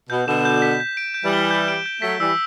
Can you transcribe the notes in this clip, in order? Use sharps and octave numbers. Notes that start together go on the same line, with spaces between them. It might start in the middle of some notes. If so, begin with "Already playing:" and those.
B2 G6
B2 D3 E7
G6
B6
G6
D7
G6
E3 G3
G7
G6
D7
G6
F#3 A3 B6
E3 G3 E6